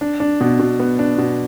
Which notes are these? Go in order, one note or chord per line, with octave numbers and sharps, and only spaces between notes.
D4
D4
B2
B2
B3
D4
B2